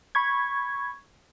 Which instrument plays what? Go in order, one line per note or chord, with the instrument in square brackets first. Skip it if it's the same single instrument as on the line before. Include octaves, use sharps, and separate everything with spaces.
[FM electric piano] B5 C#6 G#6